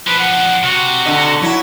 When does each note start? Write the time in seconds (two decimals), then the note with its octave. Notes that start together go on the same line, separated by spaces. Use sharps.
0.07 F3 D4 B4
0.19 F#5
0.64 C3 F#4
1.06 D3 D#5
1.42 F#3 E4